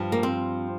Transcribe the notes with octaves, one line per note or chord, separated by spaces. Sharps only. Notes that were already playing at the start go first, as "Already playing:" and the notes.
Already playing: G2 F3
A#3
C4